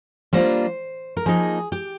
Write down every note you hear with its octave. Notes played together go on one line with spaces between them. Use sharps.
G3 A#3 D4 F4 C5
A#4
F3 A#3 D#4 G#4
G4